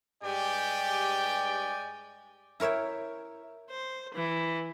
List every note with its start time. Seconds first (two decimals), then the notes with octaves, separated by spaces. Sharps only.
0.23 G2 G#3 G4 D5 G5 G#5
2.60 E4 A#4 C#5 E5 G5
3.70 C5
4.15 E3